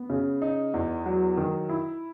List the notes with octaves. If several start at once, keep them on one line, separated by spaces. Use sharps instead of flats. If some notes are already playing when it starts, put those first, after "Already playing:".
Already playing: B3
C#3
D#4
E2
F#3
D#3
E4